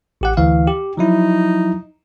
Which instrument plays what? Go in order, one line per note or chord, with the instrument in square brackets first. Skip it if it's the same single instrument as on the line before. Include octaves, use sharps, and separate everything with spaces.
[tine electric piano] A1 G4 F#5
D2 E3 F5
G4
[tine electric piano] F3 F#3 E4 [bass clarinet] D#4